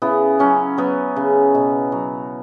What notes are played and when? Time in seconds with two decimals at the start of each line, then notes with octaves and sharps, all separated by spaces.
0.02 C#3 B3 E4
0.39 F#3 C#4
0.78 F#3 B3
1.16 C#3
1.55 B2
1.92 F#3